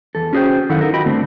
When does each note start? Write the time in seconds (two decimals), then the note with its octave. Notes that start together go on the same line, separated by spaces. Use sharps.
0.15 E2 A4
0.33 C#4 F#4 G#4 B4 C5 G5
0.69 F#2 D#3 E4 A4 F5 F#5
0.81 D#4 A4 A#4
0.93 D#2 F4 F#4 D#5 G5 B5
1.05 G2 D3 A3 C4